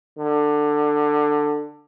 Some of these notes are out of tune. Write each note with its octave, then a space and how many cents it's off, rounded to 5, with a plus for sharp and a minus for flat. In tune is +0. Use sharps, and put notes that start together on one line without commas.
D3 +15